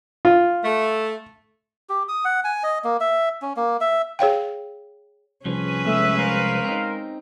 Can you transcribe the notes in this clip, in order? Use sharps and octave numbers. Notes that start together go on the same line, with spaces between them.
F4
A3
G4
D#6
F#5
G#5
D#5
A#3
E5
C#4
A#3
E5
G#4 C#5 F5 G5
C2 F3 C#4 G#4 B4
G#3 A3 A4 E5
G#3 A#4 C5 F5
C4 D#4